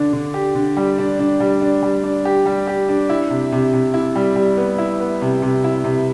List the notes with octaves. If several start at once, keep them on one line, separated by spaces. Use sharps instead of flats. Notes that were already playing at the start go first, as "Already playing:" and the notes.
Already playing: D3 D4
D3
G4
D3
G3
D4
D4
G3
D4
G3
D4
G4
G3
G4
D4
E4
C3
C3
C3
E4
G3
G3
B3
E4
B3
C3
C3
E4
C3